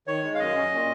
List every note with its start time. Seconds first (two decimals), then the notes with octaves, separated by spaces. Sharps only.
0.07 D#3 C#5
0.23 G#3
0.35 F5
0.39 F#2 D#5
0.56 C#4
0.72 A#2